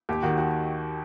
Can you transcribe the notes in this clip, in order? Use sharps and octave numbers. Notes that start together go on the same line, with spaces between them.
D#2 G4
D#3 F#4
F#4